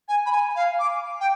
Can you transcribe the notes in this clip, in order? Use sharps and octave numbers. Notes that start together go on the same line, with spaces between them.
G#5
B5
G#5
F5
D6
G5